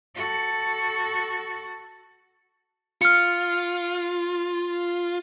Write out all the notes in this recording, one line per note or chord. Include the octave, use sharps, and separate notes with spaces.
F#4 A4
F4 F6 C#7